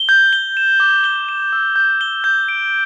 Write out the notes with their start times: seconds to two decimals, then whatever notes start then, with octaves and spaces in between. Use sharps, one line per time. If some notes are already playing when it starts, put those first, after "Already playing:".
Already playing: G7
0.09 G6
0.33 G7
0.57 E7
0.80 D6
1.04 G7
1.29 E7
1.53 E6
1.76 G6
2.01 G7
2.24 G6
2.49 D7